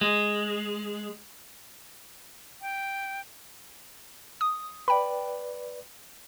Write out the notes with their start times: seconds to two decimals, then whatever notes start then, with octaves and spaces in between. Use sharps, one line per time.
0.01 G#3
2.62 G5
4.41 D#6
4.88 B4 D5 G5 B5